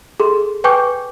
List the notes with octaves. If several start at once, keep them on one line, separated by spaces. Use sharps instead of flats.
G#4 A4 C6
B4 G5 G#5 C#6 D6 G6